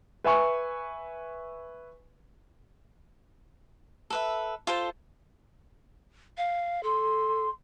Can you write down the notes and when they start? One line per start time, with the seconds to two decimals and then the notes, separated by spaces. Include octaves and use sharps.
0.24 B4 E5 G#5 C#6
4.10 A4 B4 E5
4.67 F4 A4 C5 A5
6.37 F5
6.83 A4 C6